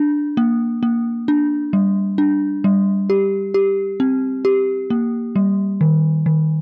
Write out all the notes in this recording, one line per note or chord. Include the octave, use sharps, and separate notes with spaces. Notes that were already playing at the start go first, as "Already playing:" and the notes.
Already playing: D4
A#3
A#3
D4
G3
D4
G3
G4
G4
C4
G4
A#3
G3
D#3
D#3